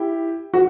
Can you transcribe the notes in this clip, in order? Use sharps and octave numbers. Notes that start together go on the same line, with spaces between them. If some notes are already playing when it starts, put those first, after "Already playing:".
Already playing: E4 G4
F#4